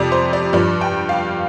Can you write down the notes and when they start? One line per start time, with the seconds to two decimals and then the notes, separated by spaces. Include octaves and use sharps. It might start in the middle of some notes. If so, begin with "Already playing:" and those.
Already playing: F2 C3 G3 D5
0.12 C5
0.33 D5
0.53 G2 F3 D5
0.81 G5
1.09 F5